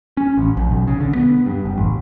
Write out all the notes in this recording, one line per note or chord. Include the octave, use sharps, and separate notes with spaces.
C#4
A1
A#1
B1
C#3
D3
B3
G2
F#1
A1